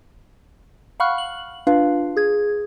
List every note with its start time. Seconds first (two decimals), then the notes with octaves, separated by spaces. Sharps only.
1.00 F5 F#5 B5 C#6 F6 F#6
1.18 F#7
1.67 D4 F4 B4 F5
2.17 G#4 G#6